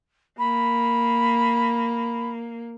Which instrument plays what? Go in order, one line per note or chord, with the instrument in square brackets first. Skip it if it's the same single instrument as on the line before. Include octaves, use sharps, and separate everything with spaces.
[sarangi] A#3 [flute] B5